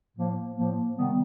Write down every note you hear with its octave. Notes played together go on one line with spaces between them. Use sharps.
A2 F3 A#3
A2 F3 A#3
C3 D#3 G3 B3